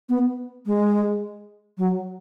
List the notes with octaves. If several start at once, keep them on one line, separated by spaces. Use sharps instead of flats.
B3
G#3
F#3